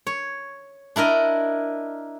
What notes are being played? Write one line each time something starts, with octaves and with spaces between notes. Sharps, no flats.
C#5
D4 E4 A#4 D#5